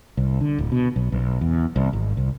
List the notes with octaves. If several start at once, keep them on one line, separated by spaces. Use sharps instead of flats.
C2
D3
D1
B2
B1
B1
E2
C2
G#1
C2